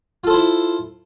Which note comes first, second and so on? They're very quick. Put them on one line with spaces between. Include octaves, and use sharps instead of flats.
F4 A4 C5 E4